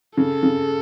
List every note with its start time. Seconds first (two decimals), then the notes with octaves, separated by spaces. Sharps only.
0.17 C#3 A4
0.43 C#3